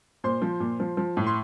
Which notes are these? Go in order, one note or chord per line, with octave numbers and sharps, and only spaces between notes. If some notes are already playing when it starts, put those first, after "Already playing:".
A#2 C5 C6
F3
A#2
F3
F3
A2
C6